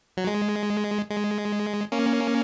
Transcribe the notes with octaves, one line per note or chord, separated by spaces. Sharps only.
F#3
G#3
G#3
A#3 C#4